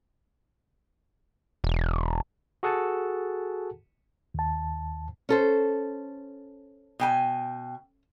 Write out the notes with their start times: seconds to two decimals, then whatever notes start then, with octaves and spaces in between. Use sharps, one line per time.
1.64 E1
2.63 F#4 G#4 A4 F#5 G#5 A5
4.34 D#2 A5
5.29 C#4 A4 C5
7.00 B2 G5 G#5